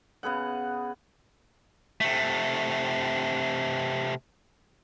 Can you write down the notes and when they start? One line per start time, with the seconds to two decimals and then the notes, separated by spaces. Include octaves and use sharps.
0.23 C#3 B3 G#4 F#5
2.01 C3 A3